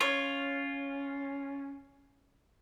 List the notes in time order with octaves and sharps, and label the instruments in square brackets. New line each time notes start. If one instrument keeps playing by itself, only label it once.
[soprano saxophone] C#4 [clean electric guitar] F4 [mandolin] C#5